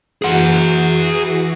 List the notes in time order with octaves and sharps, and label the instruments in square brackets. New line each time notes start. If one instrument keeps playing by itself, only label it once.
[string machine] E3 F#4 [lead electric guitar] G#4 F#5